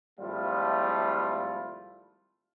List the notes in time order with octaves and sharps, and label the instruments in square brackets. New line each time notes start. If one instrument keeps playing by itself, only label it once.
[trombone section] G#1 F3 G3 A3 E4 F4